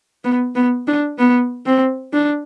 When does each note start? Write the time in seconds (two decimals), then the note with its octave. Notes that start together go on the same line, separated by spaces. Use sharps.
0.24 B3
0.55 B3
0.87 D4
1.19 B3
1.66 C4
2.13 D4